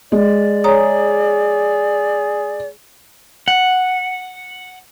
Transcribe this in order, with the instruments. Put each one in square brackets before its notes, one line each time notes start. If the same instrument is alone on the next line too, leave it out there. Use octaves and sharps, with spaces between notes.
[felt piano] G#3 [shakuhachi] D5
[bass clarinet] G#4 [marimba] C#5 A#5 D#6
[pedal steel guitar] F#5